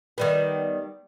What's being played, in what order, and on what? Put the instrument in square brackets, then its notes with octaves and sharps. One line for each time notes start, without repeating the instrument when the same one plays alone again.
[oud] D#3 G3 B3